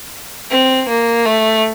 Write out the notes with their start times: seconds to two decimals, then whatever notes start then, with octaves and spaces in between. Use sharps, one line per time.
0.50 C4
0.88 A#3
1.26 A3